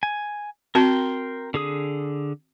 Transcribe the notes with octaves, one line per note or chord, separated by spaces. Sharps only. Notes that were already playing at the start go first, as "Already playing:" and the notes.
G#5
C4 F#4 A#4 G5 A5 C6
D3 G#4 D#6